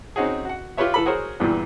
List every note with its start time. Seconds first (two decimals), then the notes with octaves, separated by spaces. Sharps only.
0.16 C4 C#4 D#4 F#4 G#4
0.45 F#4 F#5
0.77 F4 G4 B4 C#5 E5
0.94 E3 A4 B5
1.06 F#4 G#4 A#4 C5 C#5 F#5
1.40 E2 G2 A#2 E3